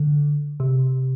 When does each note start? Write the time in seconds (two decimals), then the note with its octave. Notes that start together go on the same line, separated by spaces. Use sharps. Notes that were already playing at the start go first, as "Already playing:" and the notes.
Already playing: D3
0.60 C3